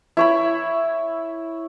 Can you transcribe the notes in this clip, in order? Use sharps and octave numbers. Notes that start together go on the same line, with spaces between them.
E4 C#5 B5